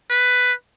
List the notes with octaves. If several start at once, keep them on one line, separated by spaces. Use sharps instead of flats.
B4